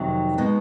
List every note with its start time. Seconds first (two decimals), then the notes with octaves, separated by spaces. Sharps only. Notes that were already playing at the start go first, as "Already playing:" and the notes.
Already playing: F2 C3 D#3 F#3
0.38 B2 G#3 B3 D#4